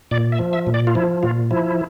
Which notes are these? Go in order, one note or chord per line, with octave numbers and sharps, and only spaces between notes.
A#2 D5
E5
F3
E5
A#2
D5
F4
F3 E4
A#2 F4
F3 E4